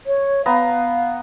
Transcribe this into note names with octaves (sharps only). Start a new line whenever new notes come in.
C#5
B3 F5 A#5